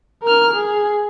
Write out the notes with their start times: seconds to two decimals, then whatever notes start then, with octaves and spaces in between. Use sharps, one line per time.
0.23 A#4 F6
0.54 G#4